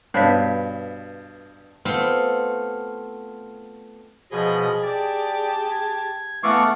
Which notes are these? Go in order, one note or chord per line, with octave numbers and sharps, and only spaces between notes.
G2 B2 D#4 C5 C#5 F5 B5 B6
A3 B3 C4 F4
B2 F3 G#4 D#5 B5
G4 D5 A5
G#6
E3 A3 B3 A4 F5 F#5 C#6 D6